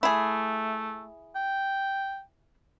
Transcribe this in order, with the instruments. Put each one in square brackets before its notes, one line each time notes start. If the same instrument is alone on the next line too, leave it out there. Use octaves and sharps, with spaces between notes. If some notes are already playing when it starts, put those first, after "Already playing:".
[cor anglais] A3 [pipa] E4 G#4
[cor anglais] G5